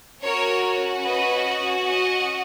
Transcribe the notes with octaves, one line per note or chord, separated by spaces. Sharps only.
C#4 F#4 A#4 C#5
B4 D#5
D#5 F#5